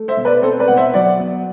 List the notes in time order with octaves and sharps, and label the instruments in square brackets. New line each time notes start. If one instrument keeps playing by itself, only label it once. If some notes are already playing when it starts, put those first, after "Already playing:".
Already playing: [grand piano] A3
C5 E5
B2
B4 D5
C4 A4 C5
B4 D5
B2 F#5
C5 E5
F#3 D5 F#5
B3